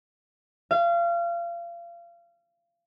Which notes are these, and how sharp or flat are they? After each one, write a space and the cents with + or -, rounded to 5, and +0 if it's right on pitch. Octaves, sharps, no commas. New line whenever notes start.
F5 -30